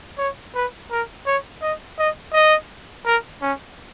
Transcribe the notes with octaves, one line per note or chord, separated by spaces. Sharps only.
C#5
B4
A#4
C#5
D#5
D#5
D#5
A#4
C#4